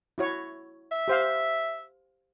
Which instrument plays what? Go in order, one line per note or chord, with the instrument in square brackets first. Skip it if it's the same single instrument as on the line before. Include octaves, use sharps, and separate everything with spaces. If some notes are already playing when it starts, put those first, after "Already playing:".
[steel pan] E4 F#4 C#5
[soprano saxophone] E5
[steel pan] G4 C5 F5